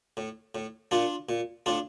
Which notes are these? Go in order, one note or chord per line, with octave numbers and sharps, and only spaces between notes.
A2
A2
A#2 D4 F4
A#2
A2 D4 F4